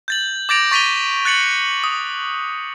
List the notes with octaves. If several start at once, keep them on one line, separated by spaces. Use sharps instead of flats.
G6 A6 F#7
D6 G6 A6 A#6 D7 F7
C#6 A6 B6 D#7 F7 G7
F#6 A6 C#7 F#7
D#6